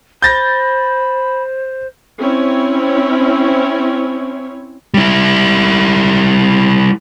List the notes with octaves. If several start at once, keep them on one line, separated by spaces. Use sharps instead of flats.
C5 B5 G6 A6 A#6
C4 C#4 E4 C#5
G3 E4